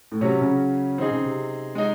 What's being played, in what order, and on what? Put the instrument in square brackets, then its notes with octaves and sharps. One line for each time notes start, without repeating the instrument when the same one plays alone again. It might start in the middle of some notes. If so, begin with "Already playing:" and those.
[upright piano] A2
[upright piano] C3 [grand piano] F#3 C#4 F#4
[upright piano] C#3
[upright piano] D#3 [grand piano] C4 D#4 G#4
[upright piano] C#3
C3
[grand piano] G#3 D#4